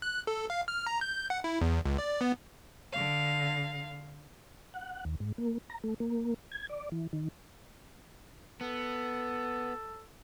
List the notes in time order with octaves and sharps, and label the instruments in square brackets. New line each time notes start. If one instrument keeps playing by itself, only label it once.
[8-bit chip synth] F#6
A4
F5
F6
A#5
G6
F#5
E4
E2
C#2
D5
B3
[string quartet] D3 F5
[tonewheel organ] F#5
D#2
G#2
A#3
A#5
A3
A#3
G#6
D5
E3
D#3
[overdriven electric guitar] B3 [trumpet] A4